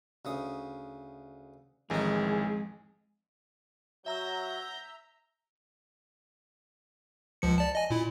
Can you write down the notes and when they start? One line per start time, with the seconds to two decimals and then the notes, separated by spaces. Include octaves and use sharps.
0.25 D2 C#3 D#6
1.90 A1 F2 D#3 E3 G#3 D#4 G#4
4.06 F#3 E5 A#5 E6 G6 A#6
7.42 C#2 F3 C#7
7.58 D5 A5
7.75 D#5 G#5
7.90 A#2 E4